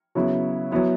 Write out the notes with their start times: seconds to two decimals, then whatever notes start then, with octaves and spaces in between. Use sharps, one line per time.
0.15 C#3 F#3 B3 E4
0.71 F#3 B3 E4